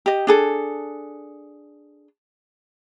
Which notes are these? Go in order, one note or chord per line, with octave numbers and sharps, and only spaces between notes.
G4 D#5
D4 G#4 A4